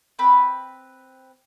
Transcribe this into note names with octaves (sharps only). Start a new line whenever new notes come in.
C4 B4 B5